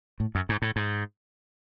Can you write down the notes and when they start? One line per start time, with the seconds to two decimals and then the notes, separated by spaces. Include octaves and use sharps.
0.20 A2
0.35 F#2
0.49 G#2
0.62 A2
0.76 G#2